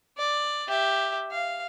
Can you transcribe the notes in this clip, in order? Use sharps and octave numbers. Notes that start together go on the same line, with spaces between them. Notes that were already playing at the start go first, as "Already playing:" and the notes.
D5
G4 E5
F5